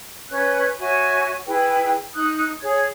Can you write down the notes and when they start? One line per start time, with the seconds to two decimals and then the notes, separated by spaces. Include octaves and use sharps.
0.31 C#4 B4 C#5 F#6
0.79 F#4 C#5 E5 G#5
1.47 E4 G#4 B4 G5
2.15 D#4 D#6 F#6
2.62 G#4 C#5 G#6